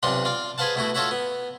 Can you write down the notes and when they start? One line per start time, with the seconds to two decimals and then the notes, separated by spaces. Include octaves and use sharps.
0.03 B1 C3 D4 F4 F#5 C6
0.25 F4 D5 F5
0.58 G#4 B4 C5 F5 F#5 A5
0.75 B2 A3 E4 F#4
0.95 F4 F#4 A4 C#5 E5 F#5
1.11 B3